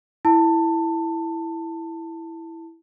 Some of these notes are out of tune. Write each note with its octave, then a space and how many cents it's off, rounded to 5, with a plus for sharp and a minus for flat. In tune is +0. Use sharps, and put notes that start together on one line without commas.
E4 +0 A5 +20